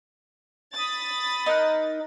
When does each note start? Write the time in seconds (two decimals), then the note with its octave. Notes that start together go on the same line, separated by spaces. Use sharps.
0.74 B5 D#6 A6
1.46 D#4 A#4 F#6